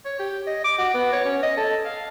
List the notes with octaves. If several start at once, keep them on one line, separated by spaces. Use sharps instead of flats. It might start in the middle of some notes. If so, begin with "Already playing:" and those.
C#5
G4
D#5
D6
F#4
B3
C#5
C#4
D#5
A4
F5